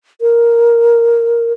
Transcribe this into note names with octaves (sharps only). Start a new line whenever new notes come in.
A#4